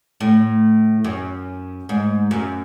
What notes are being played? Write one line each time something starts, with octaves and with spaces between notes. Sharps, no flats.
A2
F#2
G#2
F#2